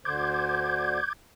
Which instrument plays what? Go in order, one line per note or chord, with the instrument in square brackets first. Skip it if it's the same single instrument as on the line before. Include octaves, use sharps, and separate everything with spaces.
[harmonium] D2 D3 C5 [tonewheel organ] D6 G6 G#6